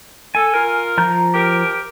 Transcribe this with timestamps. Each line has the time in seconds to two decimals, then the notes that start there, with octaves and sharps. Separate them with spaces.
0.35 A4 G#5
0.53 F4 A#4
0.98 F3 A#5 G6
1.33 G4 A#4